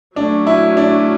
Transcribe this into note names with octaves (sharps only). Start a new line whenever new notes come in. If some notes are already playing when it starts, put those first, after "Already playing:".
F#3 A3 C#4 D4
E4
D4